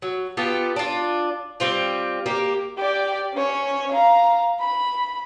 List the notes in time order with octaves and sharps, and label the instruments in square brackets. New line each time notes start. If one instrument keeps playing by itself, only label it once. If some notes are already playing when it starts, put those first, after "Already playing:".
[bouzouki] F#3
B3 F4 G4 A4
D4 F4
G3 C4 F4
A#3 G4
[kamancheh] G4 D5
C#4 C#5
F5 A#5
B5